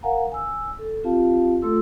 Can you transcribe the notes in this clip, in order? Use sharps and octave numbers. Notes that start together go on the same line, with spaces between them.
A#4 F5 F#5 G#5 A#5
G#5 E6
A4
C4 F4 G4 F5 A5
A3 F4 A4 C6 E6